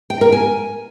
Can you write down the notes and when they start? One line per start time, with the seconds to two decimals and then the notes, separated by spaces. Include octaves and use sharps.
0.10 G5
0.21 A#4
0.32 G#5